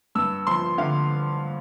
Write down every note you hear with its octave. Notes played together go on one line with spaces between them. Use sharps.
G2 E6
F3 C6
D3 F5